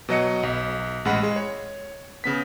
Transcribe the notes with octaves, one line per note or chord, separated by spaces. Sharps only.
B2 F#3 D#5 C#7
B1
A1 G#3 F#5 B5
G#3
C#5
C#3 B3 B6